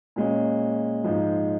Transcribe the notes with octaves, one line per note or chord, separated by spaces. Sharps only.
A#2 G#3 C#4
G#2 F3 G#3